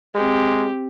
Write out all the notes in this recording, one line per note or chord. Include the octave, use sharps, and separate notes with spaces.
G#3 C4 G4